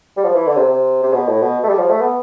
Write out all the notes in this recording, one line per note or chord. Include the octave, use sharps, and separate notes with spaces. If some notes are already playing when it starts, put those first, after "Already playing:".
G3
F3
E3
D3
C3
C3
C3
B2
A2
B2
A3
G3
F3
A3
B3